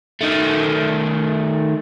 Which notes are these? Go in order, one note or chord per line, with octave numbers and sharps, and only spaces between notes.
D#3 A3